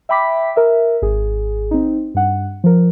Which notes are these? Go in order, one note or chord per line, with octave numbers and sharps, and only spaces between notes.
E5 G5 B5 D6 B6
A#4 E5
G#1 G#4
C4 D#4
G2 F#5
F3 A#4